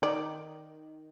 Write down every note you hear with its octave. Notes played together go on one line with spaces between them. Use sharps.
D#3 D5